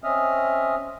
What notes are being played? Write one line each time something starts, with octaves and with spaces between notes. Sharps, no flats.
C4 C#4 D#5 E5 D#6 F6